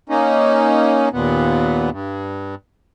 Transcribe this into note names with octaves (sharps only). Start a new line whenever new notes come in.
A#3 C#4 D#4
D#2 A#2 B3
G2